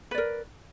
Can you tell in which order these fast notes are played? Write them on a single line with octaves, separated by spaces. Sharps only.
B4 D5 A#4